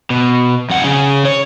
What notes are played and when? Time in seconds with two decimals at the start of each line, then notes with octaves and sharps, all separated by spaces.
0.10 B2
0.69 F2 F#5
0.84 C#3 G#4
1.25 C#5